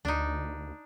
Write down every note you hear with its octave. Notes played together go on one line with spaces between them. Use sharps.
D2 D4 D#4